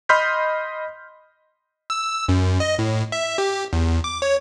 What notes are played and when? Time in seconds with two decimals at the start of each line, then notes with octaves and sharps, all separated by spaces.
0.09 D#5 B5 C6 F6 G6 B6
1.90 E6
2.29 F#2
2.60 D#5
2.79 A2
3.12 E5
3.38 G4
3.73 E2
4.04 D6
4.22 C#5